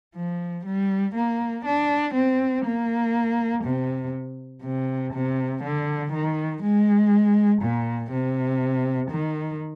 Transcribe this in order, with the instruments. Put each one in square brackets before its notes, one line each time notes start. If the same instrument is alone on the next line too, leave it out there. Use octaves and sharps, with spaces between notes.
[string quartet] F3
G3
A#3
D4
C4
A#3
C3
C3
C3
D3
D#3
G#3
A#2
C3
D#3